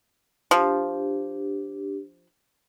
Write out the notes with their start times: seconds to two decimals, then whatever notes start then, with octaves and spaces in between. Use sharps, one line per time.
0.51 F3 D4 G4